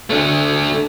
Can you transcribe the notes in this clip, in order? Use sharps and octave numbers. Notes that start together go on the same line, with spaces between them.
A3 D4